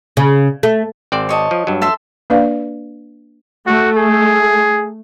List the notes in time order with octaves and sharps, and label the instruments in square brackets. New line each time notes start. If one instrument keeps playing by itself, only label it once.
[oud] C#3
A3
[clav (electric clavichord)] G#1 C4 D5
[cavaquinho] C#5 D#5 A5
[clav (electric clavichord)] F3
G2 F#3
[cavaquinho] A4 E5 C6
[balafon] A#3 D4 B4 D5 F5
[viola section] A3 [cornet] F#4
[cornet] G#4